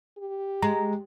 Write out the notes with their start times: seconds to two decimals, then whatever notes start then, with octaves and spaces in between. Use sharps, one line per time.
0.18 G4
0.62 G#3 A#5